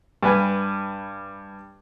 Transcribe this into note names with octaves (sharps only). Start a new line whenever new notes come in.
G2 B4 G#5